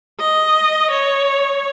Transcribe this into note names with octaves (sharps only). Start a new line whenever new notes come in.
D#5
C#5